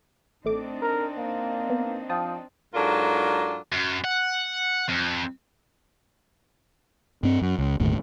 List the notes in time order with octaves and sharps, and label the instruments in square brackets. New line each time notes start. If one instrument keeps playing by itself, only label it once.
[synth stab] A1 A3 D6 [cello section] C4 D4 D#4
[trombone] A#4
A#3
[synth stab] B3
[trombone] F3 [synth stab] G5 A5 D#6
[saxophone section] G#2 F#3 D4 F4 A4 A#4
[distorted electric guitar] F#2
F#5
F2
[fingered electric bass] G2 C4
F#2
C#2
G1 D#2 A2